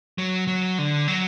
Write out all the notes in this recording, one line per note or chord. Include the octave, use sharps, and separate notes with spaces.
F#3
F#3
D3
F#3